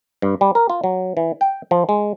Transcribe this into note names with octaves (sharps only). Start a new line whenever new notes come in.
G2
G3
A#4
F4
F#3
E3
G5
F3
G#3